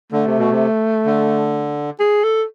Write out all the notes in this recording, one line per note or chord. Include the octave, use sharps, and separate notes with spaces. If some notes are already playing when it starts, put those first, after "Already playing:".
D3 A3
C3
B2
C3
D3
G#4
A4